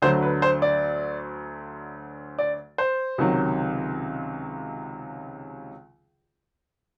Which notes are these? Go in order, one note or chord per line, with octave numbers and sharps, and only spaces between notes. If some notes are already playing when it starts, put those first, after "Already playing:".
D2 D3 F#3 C5
B4
C5
D5
D5
C5
C#2 C3 D#3 F#3